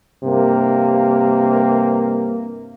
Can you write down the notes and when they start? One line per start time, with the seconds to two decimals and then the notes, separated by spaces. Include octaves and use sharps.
0.24 G2 C3 A#3